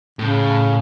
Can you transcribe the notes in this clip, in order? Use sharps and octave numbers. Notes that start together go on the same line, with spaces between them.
A2 C#3